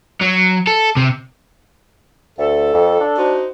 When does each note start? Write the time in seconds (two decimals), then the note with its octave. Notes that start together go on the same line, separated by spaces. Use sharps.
0.21 F#3
0.67 A4
0.97 C3
2.39 D2 A4
2.74 F2
3.00 D4
3.17 D#4 F#4 C5